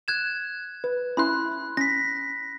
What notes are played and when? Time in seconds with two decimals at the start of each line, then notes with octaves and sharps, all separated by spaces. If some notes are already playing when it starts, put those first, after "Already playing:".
0.08 F#6 G#6 E7
0.84 B4
1.17 C#4 E4 B5 C6 F#6
1.77 C#4 A#6 B6